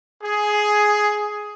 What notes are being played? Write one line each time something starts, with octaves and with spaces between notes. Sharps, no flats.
G#4